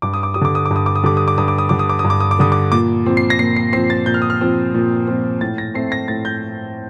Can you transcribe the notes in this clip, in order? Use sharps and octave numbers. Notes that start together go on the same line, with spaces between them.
G2 D6
D#6
D6
G3 D#6
D3 D6
D#6
D6
G2
D#6
D6
D#6
D3 G3 D6
D#6
D6
G2 D#6
D6
D#6
D3 G3 D6
D#6
D6
D#6
G2
D6
D#6
D6
D3 G3 D#6
D6
A#2 D6
F3 C4
C7
A#6
A#2 C7
C7
F3 C4 C7
A6
A#2 G6
F6
D#6
F6
F3 C4
A#2
F3 C4
A2 A6
A#6
A3 C4 C7
A#6
A2 A6
G6